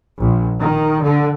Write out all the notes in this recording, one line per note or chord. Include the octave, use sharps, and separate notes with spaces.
A#1
D#3
D3